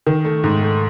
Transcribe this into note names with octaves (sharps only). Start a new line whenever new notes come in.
D#3
A3
G#2
A3